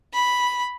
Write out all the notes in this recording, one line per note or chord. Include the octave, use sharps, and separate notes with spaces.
B5